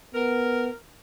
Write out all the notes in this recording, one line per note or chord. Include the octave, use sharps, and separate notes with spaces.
B3 A#4